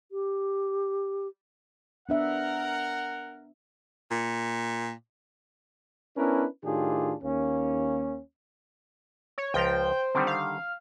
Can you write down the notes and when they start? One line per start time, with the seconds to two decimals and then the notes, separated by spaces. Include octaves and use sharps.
0.12 G4
2.09 B3 D4 A#4 E5 F#5
4.11 A#2
6.17 B3 C#4 D4 E4 A#4 B4
6.65 A2 D#3 D4 F4 G4 G#4
7.23 D#2 A#3 C#4
9.38 C#5
9.54 C#2 F3 C5 G5 A#5
10.15 D3 D#3 G3 C4
10.27 F5